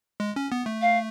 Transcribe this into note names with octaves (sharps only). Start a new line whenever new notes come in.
G#3
C#4
B3
A3
F5